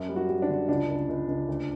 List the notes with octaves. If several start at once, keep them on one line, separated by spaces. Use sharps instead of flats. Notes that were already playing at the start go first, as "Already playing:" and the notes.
Already playing: F#2
G3
F#4
G3
D4
D3
C#2 D4
C#2
C#2
C#2
D2